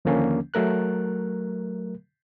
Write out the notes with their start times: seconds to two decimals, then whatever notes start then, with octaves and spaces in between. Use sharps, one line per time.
0.05 D#2 D3 F3 A#3 C#4
0.54 F#3 A3 A#4 F#6